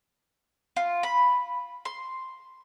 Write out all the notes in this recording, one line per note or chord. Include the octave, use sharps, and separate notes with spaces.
F4
B5
C6